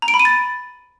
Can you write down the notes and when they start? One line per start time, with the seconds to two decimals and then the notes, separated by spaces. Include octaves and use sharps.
0.02 A#5
0.08 D7
0.14 B5
0.20 D#7
0.25 A6